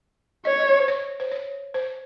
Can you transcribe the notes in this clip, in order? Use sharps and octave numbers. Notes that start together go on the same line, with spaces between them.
C#5 D#5
D#5
C5
C#5
C5
C#5
C5